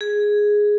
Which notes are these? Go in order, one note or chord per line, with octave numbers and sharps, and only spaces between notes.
G#4